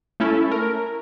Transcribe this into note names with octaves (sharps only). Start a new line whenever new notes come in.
A3 C#4 E4 A4
A#4